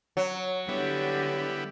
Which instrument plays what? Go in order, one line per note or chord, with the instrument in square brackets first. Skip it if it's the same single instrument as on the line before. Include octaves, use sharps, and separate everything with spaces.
[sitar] F#3
[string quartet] D3 G4 [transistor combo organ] G3 B3 E4